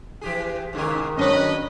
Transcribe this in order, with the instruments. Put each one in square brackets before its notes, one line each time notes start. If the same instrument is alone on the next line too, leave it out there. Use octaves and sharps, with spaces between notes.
[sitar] E3 G4 G#4
[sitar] G#2 C3 G#4 [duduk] D#3
[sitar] F#3 A#3 [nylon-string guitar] C#4 D4 C#5 [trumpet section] B4 D#5